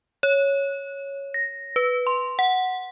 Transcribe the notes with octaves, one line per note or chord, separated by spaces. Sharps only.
C#5
A#6
B4
C6
F#5